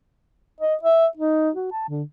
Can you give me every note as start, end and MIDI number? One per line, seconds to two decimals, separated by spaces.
0.61 0.75 75
0.83 1.07 76
1.17 1.50 63
1.55 1.69 66
1.72 1.88 81
1.89 2.03 50